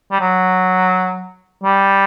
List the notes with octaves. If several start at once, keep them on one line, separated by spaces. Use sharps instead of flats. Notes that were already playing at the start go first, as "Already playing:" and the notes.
G3
F#3
G3